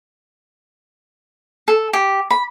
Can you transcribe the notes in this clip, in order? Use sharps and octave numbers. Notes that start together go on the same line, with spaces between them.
A4
G4
B5